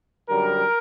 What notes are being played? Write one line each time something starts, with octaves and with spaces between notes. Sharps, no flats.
F#2 D3 G3 A#4